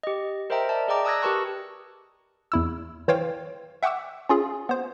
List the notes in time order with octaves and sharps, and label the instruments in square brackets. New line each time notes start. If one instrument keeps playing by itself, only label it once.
[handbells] G4 D#5
A#4 C5 D#5 E5 G5 A#5
D5 E5 A5
G#4 D5 D#5 G5 A#5 D6
A5 D#6 E6 F#6 G#6 A#6
G4 A#4 B4 A5 C#6 F#6
[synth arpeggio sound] E2 E4 E6
E3 C5 C#5 F5 G5
E5 F#5 G5 C#6 D6 E6
C#4 F4 G#4
B3 C5